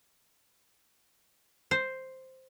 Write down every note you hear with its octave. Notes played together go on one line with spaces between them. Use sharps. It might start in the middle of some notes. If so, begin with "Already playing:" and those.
C5